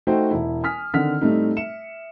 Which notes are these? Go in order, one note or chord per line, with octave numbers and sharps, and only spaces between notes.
A3 D#4 F#4 C5 E5 G5
E1 E4
G#5 D#6 F6 B6
D3 D#3 C4 F#5 F6 B6
A2 G3 A3 C4 D#4
E5 C#7 E7